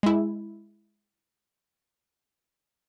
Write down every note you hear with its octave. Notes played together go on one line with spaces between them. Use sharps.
G#3 E4